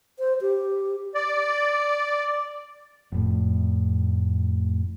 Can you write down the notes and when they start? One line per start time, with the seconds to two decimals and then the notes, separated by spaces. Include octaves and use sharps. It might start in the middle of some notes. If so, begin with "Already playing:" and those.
0.19 C5
0.41 G4
1.15 D5
3.12 F1 A2